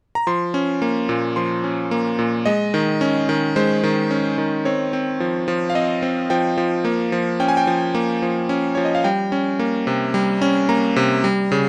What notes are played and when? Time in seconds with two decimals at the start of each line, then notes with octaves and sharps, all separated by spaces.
0.15 A#5
0.27 F3 C6
0.54 C#4
0.82 A#3
1.09 A#2
1.36 F3 C6
1.64 C#4
1.91 A#3
2.19 A#2
2.46 G#3 D#5
2.74 D#3
3.01 C#4
3.29 D#3
3.56 G#3 C5
3.84 D#3
4.11 C#4
4.38 D#3
4.65 C4 C#5
4.93 C4
5.20 F3
5.48 F3
5.70 F5
5.75 C4 D#5
6.02 C4
6.30 F3 G5
6.57 F3
6.85 A#3
7.12 F3
7.40 C#4 G5
7.48 G#5
7.57 G5
7.67 F3
7.95 A#3
8.22 F3
8.49 C#4
8.75 F3 C#5
8.85 D#5
8.95 F5
9.04 G3 G5
9.32 C#4
9.59 A#3
9.87 C3
10.14 G3
10.42 C#4
10.69 A#3 A#5
10.96 C3
11.24 G3
11.52 C#3